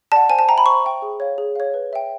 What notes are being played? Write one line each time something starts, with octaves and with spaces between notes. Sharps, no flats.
D5 F#5 A5
C5 G#5
A5
E5 G5 A#5
B5
C5 C#6
E5 G5
G#4
C#5 F5
G#4
C#5 F5
B4
E5 G5